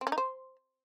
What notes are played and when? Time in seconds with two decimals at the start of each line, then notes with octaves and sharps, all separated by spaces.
0.01 C4
0.07 C#4
0.12 D#4
0.18 C5